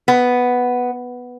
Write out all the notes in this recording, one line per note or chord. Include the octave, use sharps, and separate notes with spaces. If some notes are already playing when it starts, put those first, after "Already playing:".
B3